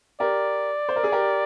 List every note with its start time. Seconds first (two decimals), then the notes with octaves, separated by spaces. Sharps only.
0.20 G4 A#4 D5
0.89 C5
0.96 A#4
1.03 G#4
1.12 G4 A#4